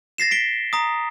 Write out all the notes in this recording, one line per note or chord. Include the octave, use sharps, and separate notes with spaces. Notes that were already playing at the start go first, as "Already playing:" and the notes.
A6 A#6 C7 E7
B6 D7 G7
A#5 D#6